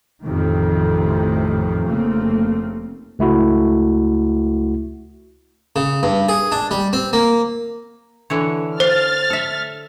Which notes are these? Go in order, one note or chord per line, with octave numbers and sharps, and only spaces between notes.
A1 F2 A2 C3 D#3
F1 C#3 A3 A#3 C4
C#2 A3 E4 F#4
C#3
G2
G#4
D4
G3
C4
A#3
D3 E3 C#5
C5 F5 F6 A6
A4 E5